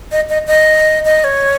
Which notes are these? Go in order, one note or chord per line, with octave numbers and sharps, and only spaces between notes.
D#5
D#5
D#5
D#5
C#5